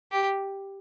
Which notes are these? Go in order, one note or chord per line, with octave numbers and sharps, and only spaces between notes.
G4